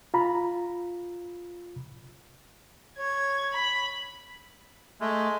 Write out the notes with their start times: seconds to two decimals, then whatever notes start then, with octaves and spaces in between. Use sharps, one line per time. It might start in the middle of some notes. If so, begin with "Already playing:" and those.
0.14 F4 A#5 B5
2.98 C#5 G#6
3.53 B5
5.01 G#3 A3